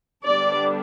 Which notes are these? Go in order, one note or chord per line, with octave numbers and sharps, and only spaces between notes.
D3 G3 B3 D4 D5